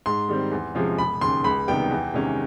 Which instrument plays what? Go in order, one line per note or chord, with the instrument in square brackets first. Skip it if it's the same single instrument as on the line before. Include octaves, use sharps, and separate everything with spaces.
[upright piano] G#2 [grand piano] C6
[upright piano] D#3 G3 C4
E2
C3 F3 G#3 C#4
[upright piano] E1 [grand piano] B5
[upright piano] D#2 C#3 [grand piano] C6
[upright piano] C#2 [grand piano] B5
[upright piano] C3 D#3 G3 B3 [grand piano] G5
[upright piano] E2
C3 D#3 G#3 C#4